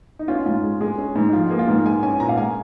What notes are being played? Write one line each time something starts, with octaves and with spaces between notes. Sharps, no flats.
D#4
C#4 F4
G#2 F4
G#3
G#3 G#4
C#4
G#2
D#4
F3 F4
A#3 G#4
F4
G#2
G#3 G#5
C#4 G#5
A#2 A#5
F5
G#3 G#5